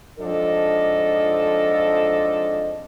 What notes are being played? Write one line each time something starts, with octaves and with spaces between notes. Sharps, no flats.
F2 G#2 F3 D4 A4 D#5